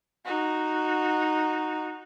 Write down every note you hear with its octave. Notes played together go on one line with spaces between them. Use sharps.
D#4 F#4